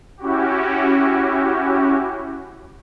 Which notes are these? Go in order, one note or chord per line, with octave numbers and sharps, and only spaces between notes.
C#4 E4 F#4 G4